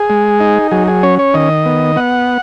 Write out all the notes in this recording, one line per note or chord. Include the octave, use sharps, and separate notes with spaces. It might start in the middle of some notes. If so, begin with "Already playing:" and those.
Already playing: G#4
G#3
D#4
F#3 G#4
G#4
C#4 C#5
C#5
D#3 D#5
B3
B3 F#5